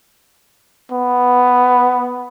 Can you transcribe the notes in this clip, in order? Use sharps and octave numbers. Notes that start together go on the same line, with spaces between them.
B3